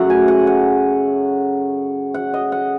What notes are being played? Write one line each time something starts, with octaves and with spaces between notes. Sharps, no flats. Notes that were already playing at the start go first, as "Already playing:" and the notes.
Already playing: F#2 C#3 F#3 A3 F#5
G#5
F#5
F#5
F#5
D#5
F#5